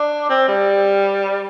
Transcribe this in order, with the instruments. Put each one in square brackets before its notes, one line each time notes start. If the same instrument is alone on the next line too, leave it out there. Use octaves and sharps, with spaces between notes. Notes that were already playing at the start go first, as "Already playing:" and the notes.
Already playing: [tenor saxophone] D4
C4
G3